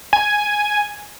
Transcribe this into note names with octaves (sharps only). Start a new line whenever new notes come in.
G#5